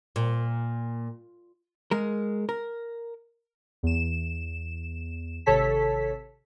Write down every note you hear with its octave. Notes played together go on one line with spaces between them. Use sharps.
A#2
G#3 A#4
A#4
E2 E7
G#1 C3 A4 C#5 A5 B6